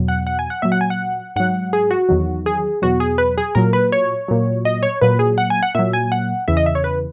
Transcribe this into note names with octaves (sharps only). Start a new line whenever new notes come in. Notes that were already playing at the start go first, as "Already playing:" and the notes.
Already playing: E2 B2 F#3
F#5
F#5
G#5
F#5
A#2 F#3 E5
F#5
G#5
F#5
G#2 F#3 F#5
G#4
F#4
E2 D#3 F#3
G#4
E2 B2 F#3 F#4
G#4
B4
G#4
A#2 F#3 A#4
B4
C#5
A#2 F#3
D#5
C#5
A#2 F#3 B4
G#4
F#5
G#5
F#5
A#2 F#3 E5
G#5
F#5
E2 C#3 E3 E5
D#5
E5
C#5
B4